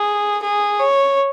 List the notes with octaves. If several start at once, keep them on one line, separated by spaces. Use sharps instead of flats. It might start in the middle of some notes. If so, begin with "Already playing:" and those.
Already playing: G#4
G#4
C#5